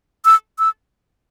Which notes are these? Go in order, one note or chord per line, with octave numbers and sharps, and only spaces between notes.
E6
E6